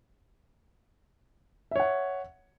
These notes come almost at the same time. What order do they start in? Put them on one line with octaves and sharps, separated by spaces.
E5 C#5 F#5